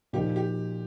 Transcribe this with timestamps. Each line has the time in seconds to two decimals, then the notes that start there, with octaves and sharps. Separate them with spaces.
0.13 A#2 F3 A#3 D#4 G4
0.36 G4